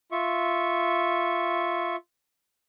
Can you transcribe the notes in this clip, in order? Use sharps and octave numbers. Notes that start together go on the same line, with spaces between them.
F4 E5 C#6